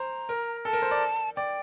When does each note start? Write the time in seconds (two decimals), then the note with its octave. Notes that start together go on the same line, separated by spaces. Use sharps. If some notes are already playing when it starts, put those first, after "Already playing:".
Already playing: C5 A#5
0.29 A#4
0.65 A4 A5
0.73 A#4
0.82 C5
0.91 D5
1.36 D5 G5